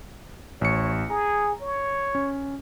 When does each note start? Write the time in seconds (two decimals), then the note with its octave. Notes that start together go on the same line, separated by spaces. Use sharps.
0.61 A1 C#5 C#7
1.10 G#4 A#5
1.62 C#5
2.15 C#4